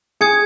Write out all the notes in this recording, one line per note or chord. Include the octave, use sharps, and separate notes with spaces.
G#4 D#6 G#6 C#7